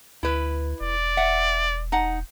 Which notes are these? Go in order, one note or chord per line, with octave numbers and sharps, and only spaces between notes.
D2 E4 B4
E1 D5
E5 F#5
D#4 F#5